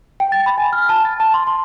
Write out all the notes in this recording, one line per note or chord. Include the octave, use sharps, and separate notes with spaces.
G5
A6
B5
G#5
F6
A5
A6
A5
C6
C6